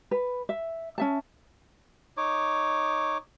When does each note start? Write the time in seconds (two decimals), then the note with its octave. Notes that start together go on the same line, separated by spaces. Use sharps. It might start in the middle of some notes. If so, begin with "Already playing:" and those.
0.11 B4
0.49 E5
0.98 C#4 E5 A5
2.17 D#4 C#5 D6